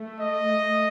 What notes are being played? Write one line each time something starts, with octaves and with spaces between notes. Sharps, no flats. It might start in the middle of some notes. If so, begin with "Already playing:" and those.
Already playing: A3
D#5
A3